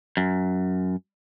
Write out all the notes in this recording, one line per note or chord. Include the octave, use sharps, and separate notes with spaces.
F#2